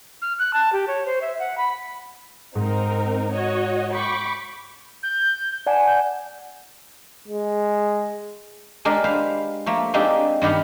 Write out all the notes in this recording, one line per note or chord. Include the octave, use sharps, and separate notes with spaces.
F6
F#6
A5
G4
C#5
C5
E5
F#5
B5
G#2 C4 D#4 A#4
F#4 C#5 D#5
G5 B5 C#6 D6 G6
G6
D5 F#5 G#5 A5
G6
G#3
G#3 D4 G4 A#4
B4 C5 F5
F3 A3 A#3
G#3 A#3 C4 D4 D#4 G4
G2 D#3 B3 G4 F5